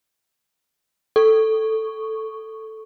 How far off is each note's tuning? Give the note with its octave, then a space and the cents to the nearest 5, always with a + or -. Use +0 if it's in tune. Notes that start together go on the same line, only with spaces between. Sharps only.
A4 +0 C#6 +0